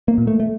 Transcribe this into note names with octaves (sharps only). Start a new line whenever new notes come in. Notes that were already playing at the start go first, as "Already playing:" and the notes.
A#3
A#2
A3
A3